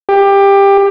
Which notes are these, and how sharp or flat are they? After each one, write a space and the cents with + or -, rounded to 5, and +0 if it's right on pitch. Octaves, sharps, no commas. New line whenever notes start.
G4 +20